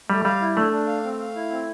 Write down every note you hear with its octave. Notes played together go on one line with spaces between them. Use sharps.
G3 A3
G3 F5
E4
A3 D4
D4
F5
C4
F5
E4
C4